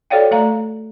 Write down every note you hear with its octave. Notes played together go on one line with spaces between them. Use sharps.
F#4 A4 C#5 D5 F5 G5
A3 D5 F5 A#5